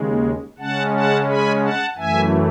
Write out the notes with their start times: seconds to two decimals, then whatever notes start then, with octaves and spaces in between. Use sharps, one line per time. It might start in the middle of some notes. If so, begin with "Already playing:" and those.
Already playing: D#2 C#3 G#3
0.59 C#3 G#3 C#4 F#5 A5
0.94 F#5 A5
1.28 G#5 B5
1.62 F#5 A5
1.97 F#2 E3 A3 E5 G#5